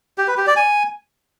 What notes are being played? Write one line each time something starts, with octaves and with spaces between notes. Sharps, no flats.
G4
B4
G4
D5
G#5